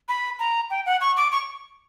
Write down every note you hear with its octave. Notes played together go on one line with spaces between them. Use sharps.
B5
A#5
G5
F#5
C#6
D6
C#6